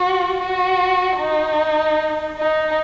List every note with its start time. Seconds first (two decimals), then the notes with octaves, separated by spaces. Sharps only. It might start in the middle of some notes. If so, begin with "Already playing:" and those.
Already playing: F#4
0.38 F#4
1.18 D#4
2.39 D#4